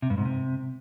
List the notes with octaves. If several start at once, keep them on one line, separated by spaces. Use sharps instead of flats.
C3
G2
G#2
C3